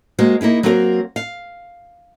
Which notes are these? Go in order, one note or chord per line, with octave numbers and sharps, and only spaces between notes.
G#3 A#3 F#4 C5
A#3 D#4 E4 G#4
F#3 A#3 C4 F#4 G#4 A#4
F5